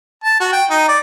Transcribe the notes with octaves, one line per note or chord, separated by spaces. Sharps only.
A5
F#4
G5
D#4
D5